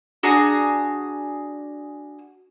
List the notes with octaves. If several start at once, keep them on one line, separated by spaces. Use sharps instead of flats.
D4 F#4 G#4 A#5